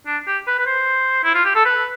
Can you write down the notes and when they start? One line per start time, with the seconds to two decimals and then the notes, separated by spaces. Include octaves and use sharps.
0.07 D4
0.27 G4
0.47 B4
0.59 B4
0.66 C5
1.24 E4
1.34 F4
1.45 G4
1.55 A4
1.65 B4